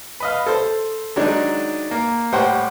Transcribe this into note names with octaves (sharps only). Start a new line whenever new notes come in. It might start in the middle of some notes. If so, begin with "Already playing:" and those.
B4 D#5 F5
A4 C5
D#3 F#3 G#3 D4 D#4
A#3
A2 G3 C5 F#5 G5 C#6